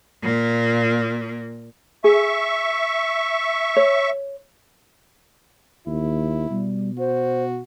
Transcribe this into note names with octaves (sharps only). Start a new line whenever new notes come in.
A#2 A#3
G#4 E5 C#6
C#5
D#2 E4
B2 G3
F#4 C5